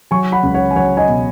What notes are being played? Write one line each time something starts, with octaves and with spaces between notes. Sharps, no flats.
F#3 G#5 C#6
F#5 B5
C#2
C#5 F#5
G#5
F#3 C#5 F#5
D#5 G#5
B2